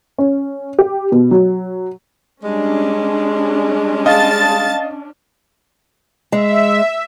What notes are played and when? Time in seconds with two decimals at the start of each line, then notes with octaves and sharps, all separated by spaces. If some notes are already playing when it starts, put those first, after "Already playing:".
0.18 C#4
0.79 G4
1.12 B2
1.31 F#3
2.44 G3 G#3 C#4 D4
4.06 D#5 F5 A5 A6
6.32 G#3 E5